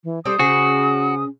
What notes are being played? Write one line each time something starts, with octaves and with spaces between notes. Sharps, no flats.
E3
G3 C4 A4 D5 D#6
C#3 C#4 F#4 G#4 C5